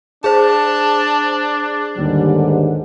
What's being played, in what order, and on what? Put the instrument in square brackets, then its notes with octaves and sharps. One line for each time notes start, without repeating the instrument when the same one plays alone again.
[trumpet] D4 [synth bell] G#4 C5 [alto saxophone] A5
[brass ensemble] D#2 G#2 D3 [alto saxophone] G3